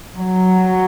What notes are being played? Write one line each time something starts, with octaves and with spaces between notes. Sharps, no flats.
F#3